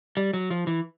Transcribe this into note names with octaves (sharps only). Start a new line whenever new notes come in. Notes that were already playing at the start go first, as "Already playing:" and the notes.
G3
F#3
F3
E3